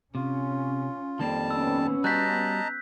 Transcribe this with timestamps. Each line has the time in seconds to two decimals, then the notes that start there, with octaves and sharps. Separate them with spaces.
0.15 C3 C#4 F4
1.19 F2 D#3 G3 A#3 C4 A5
1.51 B3 C#4 E6
2.04 G3 F#4 D#5 A5 A#5 F#6 G6 B6